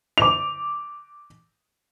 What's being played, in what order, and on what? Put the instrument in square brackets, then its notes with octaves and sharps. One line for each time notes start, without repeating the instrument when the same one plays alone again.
[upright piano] D6 F7